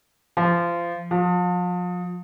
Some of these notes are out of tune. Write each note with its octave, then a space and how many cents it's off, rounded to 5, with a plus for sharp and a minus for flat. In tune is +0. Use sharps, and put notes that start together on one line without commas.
F3 -25
F3 +35